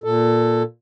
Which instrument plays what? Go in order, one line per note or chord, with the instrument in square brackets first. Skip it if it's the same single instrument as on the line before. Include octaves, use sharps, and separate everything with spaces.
[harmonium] A#2 A4